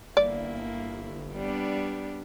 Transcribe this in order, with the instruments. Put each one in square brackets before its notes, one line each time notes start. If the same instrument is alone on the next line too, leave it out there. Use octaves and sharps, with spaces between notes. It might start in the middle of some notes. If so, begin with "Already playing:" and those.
[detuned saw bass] G1 [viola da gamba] A#3 E4 [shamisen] D5
[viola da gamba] G3 B3 D4